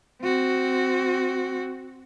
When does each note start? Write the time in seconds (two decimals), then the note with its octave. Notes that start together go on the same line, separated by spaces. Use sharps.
0.21 C4 F#4